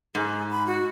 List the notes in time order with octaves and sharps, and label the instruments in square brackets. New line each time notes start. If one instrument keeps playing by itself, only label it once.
[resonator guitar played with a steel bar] G#2 [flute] G#4
[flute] B5
F#4